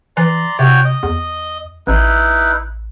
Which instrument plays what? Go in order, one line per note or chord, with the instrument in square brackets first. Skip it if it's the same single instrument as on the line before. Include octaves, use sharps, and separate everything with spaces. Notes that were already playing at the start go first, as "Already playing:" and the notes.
[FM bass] E3 [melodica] D5 A#5 C6
[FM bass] C3 [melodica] F#4 C#5 G5
[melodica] D#5
[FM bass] E2
[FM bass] A1 [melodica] D#4 E4 B4